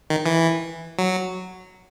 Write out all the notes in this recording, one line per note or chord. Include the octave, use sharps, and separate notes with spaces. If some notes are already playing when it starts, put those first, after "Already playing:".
D#3
E3
F#3